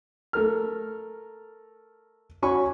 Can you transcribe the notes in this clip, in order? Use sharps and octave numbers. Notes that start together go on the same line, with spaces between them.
A3 A#4 F6
C#4 F#4 G#5 B5 C#6